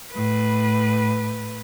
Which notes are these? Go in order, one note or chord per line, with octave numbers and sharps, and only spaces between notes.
A2 B4